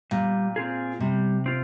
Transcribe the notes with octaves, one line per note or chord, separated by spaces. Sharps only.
A#2 G3
C4 F4 G#4
C3 G3
C4 F4